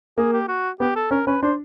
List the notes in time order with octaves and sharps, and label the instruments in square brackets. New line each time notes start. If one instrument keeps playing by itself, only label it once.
[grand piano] A#3 [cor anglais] G#4
[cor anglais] G4
F#4
[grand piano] B3 [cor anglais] G4
[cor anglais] A4
[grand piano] C#4 [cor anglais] A#4
[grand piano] C#4 [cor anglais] B4
[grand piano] D4 [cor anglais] C5